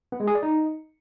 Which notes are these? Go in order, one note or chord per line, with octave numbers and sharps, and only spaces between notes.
B3
G#3
G#4
D5
D#4